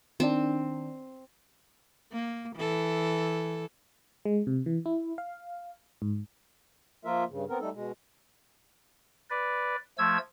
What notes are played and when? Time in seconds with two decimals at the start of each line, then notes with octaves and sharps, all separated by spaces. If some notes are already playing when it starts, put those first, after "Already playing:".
0.20 D#3 C4 D4
2.12 A#3
2.56 E3 A4
4.26 G#3
4.47 C3
4.66 E3
4.86 E4
5.18 F5
6.02 G#2
7.05 F3 A#3 F4 A#4 E5
7.29 G2 C#3
7.49 B3 C4 A#4
7.60 G3 A3 D#4 A4
7.73 B2 G#3
9.30 B4 D5
9.98 F3 A3 E6 G#6